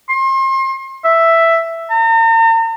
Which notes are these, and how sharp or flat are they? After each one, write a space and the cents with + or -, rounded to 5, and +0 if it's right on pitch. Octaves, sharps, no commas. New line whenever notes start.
C6 +35
E5 +5
A#5 -45